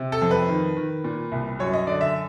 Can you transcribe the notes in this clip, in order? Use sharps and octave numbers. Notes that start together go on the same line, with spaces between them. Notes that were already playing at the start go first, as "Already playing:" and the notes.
Already playing: C3
A4
F2
B4
D#3
D#3
A#2
C2
F#2 C#5
D#5
D3 D5
E5